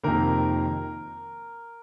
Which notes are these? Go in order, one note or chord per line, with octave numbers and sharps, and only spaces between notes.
F2 C3 D#3 A#3 A#4